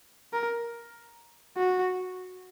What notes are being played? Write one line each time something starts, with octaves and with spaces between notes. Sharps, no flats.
A#4
F#4